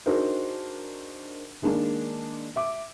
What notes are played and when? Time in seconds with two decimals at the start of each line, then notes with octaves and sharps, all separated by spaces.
0.06 D4 D#4 F#4 G#4 A#4 C5
1.62 D#3 G#3 A#3 D4
2.56 E5 D6